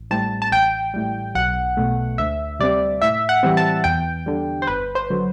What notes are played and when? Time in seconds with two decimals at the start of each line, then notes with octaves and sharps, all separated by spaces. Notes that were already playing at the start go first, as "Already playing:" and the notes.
Already playing: A1
0.11 A2 G3 C4 A5
0.42 A5
0.52 A1 G5
0.94 A2 G3
1.35 B1 F#5
1.77 B2 A3
2.18 D2 E5
2.59 C3 G3 C4 D5
3.02 A2 E5
3.29 F#5
3.43 E3 G3 C4
3.57 A5
3.84 E2 G5
4.26 D3 G3
4.62 C5
4.67 G1 B4
4.95 C5
5.10 D3 F#3